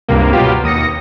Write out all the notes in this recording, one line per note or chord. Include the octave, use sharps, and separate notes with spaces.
C#2 G2 C3 A#3
B2 F#3 F4 G4
D#2 D#6 A#6 C#7